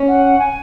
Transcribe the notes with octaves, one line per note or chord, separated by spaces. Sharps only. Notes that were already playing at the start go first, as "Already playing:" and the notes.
Already playing: C#4
F#5
G#5